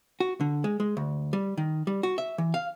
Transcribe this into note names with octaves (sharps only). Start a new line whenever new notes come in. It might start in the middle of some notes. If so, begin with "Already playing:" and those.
F#4
D3
G#3
G#3
D2
G3
D#3
G3
F#4
E5
E3
F5